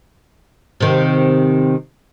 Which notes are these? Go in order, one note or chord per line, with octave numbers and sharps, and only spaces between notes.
C3 D#3